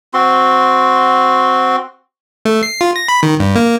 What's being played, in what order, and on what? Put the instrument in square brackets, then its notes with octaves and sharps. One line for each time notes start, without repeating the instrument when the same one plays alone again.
[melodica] C4 F#4 C6
[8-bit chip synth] A3
C7
F4
A#6
B5
D#3
G2
A#3